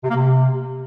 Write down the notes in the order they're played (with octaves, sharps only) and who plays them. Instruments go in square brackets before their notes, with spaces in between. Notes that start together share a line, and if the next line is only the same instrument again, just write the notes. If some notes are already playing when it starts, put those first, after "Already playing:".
[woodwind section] C3
A#3
C3